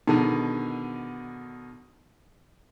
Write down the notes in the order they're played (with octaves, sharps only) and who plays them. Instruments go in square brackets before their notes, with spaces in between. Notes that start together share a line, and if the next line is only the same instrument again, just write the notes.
[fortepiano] B2 D3 D#3 [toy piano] D#4 G#4